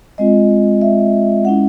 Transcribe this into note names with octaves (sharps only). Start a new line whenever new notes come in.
G#3 C4 F4 D#5
E5
G#3 C#4 E4 F#5